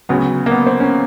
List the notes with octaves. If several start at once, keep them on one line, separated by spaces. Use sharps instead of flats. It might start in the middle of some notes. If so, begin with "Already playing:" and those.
D2 C#3 F#3 B3
A#3
B3
C4
C#4